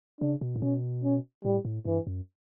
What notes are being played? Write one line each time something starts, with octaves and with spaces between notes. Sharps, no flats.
C#3 D4
B2
A2
B2 C#4
C#4
A2 G3
A2
G2 E3
F#2